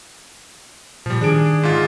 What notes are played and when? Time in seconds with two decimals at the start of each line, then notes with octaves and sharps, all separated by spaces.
1.06 A#2 F3 G3
1.21 D#3 D4 G#4 D7
1.63 G#2 F4